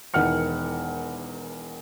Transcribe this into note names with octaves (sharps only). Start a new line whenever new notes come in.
E1 E2 D#3 F#5 F6 C#7